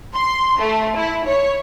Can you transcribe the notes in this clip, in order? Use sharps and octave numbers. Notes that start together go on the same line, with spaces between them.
C6
A3
E4
C#5